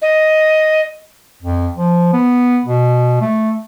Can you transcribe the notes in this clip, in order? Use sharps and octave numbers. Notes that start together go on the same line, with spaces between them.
D#5
F2
F3
B3
B2
A3